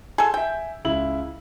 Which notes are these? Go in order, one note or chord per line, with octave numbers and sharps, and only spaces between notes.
G#4 A4 C6
E5 G5 G#5
C#2 E4 F#7